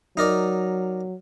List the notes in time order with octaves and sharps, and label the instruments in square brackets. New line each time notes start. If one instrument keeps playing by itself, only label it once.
[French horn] F#3 [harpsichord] D#4 A#4 D5